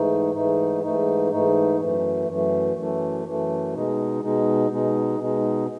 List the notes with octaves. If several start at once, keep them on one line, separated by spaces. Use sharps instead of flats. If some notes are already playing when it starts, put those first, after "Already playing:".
Already playing: G#2 E3 A3 D#4
G#2 E3 A3 D#4
G#2 E3 A3 D#4
G#2 E3 A3 D#4
F#2 E3 A3
F#2 E3 A3
F#2 E3 A3
F#2 E3 A3
B2 G#3 D#4
B2 G#3 D#4
B2 G#3 D#4
B2 G#3 D#4